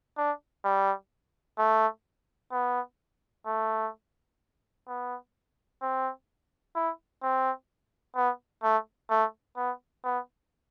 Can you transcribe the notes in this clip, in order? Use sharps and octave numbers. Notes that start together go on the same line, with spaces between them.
D4
G3
A3
B3
A3
B3
C4
E4
C4
B3
A3
A3
B3
B3